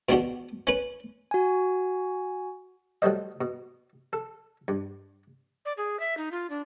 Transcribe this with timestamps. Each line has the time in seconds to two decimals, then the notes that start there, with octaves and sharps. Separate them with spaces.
0.09 B2 D4 F#4 G4
0.67 C#4 B4
1.31 F#4 G#5
3.02 F#3 G3 A3 C5 D#5
3.41 B2
4.13 A4
4.68 G2
5.65 D5
5.77 G#4
6.00 E5
6.17 D#4
6.32 F4
6.50 D4